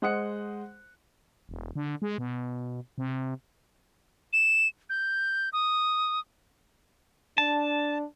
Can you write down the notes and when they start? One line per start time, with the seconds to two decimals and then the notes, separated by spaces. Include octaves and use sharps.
0.02 G#3 C5 F#5 D#6 F#6 C#7
1.49 E1
1.75 D3
2.02 G#3
2.18 B2
2.98 C3
4.33 E7
4.90 G6
5.53 D#6
7.38 D4 A5